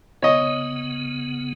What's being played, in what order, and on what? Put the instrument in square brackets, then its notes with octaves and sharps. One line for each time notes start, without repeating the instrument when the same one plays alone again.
[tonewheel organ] C#3 B3 [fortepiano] C#5 D#5